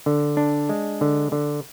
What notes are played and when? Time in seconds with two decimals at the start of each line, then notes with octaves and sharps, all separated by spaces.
0.06 D3
0.37 D4
0.69 G#3
1.01 D3
1.32 D3